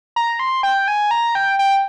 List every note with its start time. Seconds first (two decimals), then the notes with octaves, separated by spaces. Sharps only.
0.16 A#5
0.39 C6
0.63 G5
0.88 G#5
1.11 A#5
1.35 G5
1.59 G5